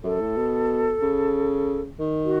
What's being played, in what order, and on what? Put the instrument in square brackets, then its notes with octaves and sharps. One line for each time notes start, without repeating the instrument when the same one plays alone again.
[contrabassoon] F#2 [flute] A4
[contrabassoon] A2
B2
C#3
D#3
[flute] F#4